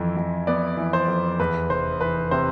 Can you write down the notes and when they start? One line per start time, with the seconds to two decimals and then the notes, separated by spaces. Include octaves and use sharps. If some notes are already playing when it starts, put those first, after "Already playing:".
Already playing: F2 E3
0.17 F2
0.47 B3 D5
0.77 E3
0.93 C5
1.08 F2
1.40 E2 B4
1.70 F1 C5
2.01 E3 B4
2.31 C3 C5